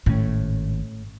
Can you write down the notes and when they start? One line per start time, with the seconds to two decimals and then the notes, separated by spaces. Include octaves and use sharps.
0.06 G#1 A2 C#4